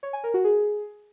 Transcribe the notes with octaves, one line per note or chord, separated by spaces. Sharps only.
C#5
G#5
A#4
F#4
G#4